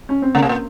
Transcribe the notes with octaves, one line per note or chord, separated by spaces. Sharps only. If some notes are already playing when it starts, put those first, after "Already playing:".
C#4
C4
C#3 A#3
C3
A#2